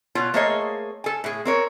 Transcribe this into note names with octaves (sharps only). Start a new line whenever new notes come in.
B2 F4 C#5
A3 A#3 G#4 C5 C#5 D#5
A4 G#5
A2 G#4
C4 A#4 C#5